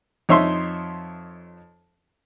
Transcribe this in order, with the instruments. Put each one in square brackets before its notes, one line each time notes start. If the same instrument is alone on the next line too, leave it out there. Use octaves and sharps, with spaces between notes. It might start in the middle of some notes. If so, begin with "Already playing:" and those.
[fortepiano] F2 D#4 C#5 E5 C6